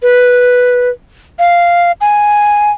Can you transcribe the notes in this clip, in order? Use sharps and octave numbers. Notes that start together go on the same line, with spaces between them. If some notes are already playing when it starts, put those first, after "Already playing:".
B4
F5
G#5